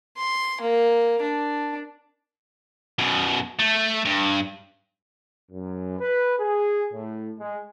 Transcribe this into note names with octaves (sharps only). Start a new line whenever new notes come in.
C6
A#3
D4
F#2 B2
A3
G2
F#2
B4
G#4
A2
G#3